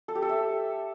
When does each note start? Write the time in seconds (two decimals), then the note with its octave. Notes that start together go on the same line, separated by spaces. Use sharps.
0.08 A4
0.15 G4
0.22 A4
0.29 E5